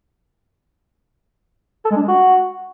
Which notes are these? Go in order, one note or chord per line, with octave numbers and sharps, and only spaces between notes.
A4
G#3
D4
G#3
F#4